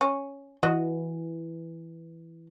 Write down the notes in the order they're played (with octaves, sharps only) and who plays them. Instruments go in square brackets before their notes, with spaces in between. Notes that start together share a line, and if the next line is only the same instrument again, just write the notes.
[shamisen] C#4
[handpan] E3 [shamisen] F#4 D#5